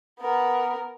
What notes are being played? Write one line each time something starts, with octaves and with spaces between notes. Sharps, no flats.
B3 A#4